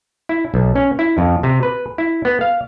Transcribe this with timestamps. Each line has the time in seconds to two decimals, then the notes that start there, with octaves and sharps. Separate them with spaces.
0.29 E4
0.54 B1
0.76 C#4
0.99 E4
1.18 F2
1.43 C3
1.63 B4
1.98 E4
2.25 B3
2.41 F5